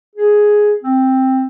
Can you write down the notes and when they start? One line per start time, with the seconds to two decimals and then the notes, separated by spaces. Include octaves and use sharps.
0.15 G#4
0.83 C4